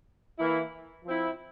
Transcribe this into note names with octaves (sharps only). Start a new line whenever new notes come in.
E3 A#3 E4
F3 C4 E4